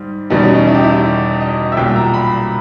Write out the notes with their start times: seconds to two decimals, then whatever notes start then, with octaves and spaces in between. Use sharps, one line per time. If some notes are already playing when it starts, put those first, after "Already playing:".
Already playing: G#2 G3
0.30 E2 B2 G3 D#4
0.42 C#4
0.55 D#4
0.67 E4
0.75 G4
0.83 E4
1.40 D#5
1.72 E5
1.77 B1 A#2 G3 G5
1.96 A#5
2.14 B5